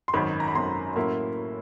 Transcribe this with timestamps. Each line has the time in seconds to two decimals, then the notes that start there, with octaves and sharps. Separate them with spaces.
0.08 C6
0.13 G#1 F#2 D#3 B5
0.40 A#5
0.48 B5
0.55 G#1 F#2 D#3 C6
0.96 A2 F#3 A#3 C#4 E4